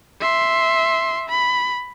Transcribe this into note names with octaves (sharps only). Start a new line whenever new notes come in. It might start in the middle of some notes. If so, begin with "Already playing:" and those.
E5 C6
B5